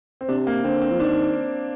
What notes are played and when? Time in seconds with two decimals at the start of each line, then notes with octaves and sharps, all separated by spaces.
0.21 C4
0.29 C3 D4
0.47 A#3
0.64 D3 C4
0.82 C4
0.91 F3
1.00 D#3 D4